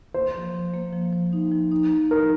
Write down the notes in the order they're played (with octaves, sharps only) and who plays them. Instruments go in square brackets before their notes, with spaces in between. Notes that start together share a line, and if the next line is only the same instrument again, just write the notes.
[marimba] A#3 [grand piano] C5
[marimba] F3
F3
A#3
F3
F3
D#4
F3
D#4
F3
[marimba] D#4 [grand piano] A#4